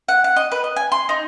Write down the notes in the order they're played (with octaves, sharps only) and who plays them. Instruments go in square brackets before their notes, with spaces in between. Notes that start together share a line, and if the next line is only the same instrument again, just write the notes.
[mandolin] F#5
F#5
D#5
B4
D#5
G#5
C6
D#4